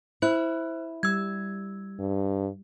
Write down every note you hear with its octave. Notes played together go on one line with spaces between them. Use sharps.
E4 C5 F#6
G3 E6 G#6
G2